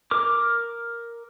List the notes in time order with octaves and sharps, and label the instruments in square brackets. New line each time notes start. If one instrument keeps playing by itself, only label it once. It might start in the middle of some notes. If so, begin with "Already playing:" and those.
[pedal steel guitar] A#4 D6